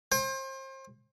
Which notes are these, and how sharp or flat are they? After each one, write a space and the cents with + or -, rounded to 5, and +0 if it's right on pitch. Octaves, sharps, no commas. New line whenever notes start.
C5 +30 G5 +40